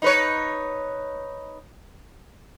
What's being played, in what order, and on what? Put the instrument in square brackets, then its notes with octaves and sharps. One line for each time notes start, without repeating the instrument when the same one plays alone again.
[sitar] D#4 B4 C#5